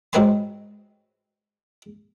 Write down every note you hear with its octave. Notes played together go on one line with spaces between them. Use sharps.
G#2 F#3 C4 B4 G#5 C6